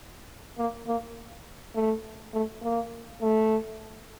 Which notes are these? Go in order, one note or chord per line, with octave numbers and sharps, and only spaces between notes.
A#3
A#3
A3
A3
A#3
A3